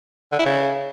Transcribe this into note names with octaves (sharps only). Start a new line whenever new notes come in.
D3
E4
C#3